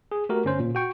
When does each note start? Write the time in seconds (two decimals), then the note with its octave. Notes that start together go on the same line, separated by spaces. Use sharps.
0.12 G#4
0.29 A3 F#4 G4 A#4
0.45 G1 C#4 C5
0.59 A#2
0.75 F#4 G5 C#6